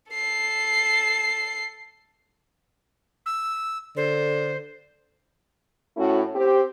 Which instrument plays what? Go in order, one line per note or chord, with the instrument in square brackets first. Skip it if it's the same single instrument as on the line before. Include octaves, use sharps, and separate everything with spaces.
[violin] A4 C7
[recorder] E6
[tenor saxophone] D3 [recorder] C5
[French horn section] A2 A3 C#4 E4 F#4
C4 G4